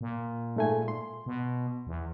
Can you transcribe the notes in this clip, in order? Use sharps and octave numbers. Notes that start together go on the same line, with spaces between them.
A#2
G#2 A3 G#5
C6
B2
E2